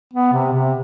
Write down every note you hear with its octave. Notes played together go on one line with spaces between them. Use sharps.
B3
C3
C3